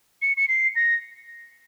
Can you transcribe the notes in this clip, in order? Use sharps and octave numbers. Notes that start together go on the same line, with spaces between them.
C#7
C#7
C7
A#6